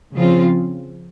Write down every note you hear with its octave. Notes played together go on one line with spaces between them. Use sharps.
C#3 F3 C4 F4